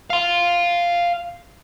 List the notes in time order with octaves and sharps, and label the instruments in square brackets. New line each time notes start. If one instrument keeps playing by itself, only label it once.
[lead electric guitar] F5 C6